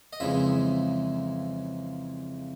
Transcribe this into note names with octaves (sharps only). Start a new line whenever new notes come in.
D#5
F2 C#3 E3 G#3 E5